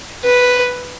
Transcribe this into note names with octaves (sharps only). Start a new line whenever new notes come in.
B4